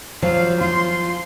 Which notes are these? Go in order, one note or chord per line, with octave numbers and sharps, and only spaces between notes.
F3 F#3 F5
F4 C6